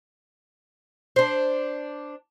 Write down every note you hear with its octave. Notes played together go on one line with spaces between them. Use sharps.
D4 C5